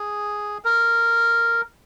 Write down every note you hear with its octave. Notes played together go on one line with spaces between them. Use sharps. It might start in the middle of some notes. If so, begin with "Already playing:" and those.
Already playing: G#4
A#4